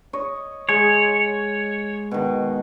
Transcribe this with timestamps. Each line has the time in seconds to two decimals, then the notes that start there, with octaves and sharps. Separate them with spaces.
0.13 C#5 D#5
0.69 G#3 C#5
2.11 B2 D#3